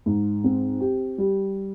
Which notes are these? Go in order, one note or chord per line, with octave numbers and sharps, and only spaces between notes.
G#2
C4
G4
G3